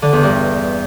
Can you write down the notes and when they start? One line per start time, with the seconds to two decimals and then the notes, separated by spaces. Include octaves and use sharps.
0.02 D3
0.13 E2
0.23 G2